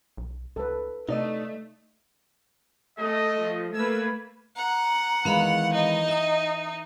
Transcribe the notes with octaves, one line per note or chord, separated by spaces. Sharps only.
B1
C#2 A4 B4
C3 A3 D#4 D5 D#5
A3 D#5
F3
A3 A#3 B4 E6 G#6
F#5 A#5
D#3 E3 G#3 B3 F5 B5
D#4 D#5
E5 G5 D#6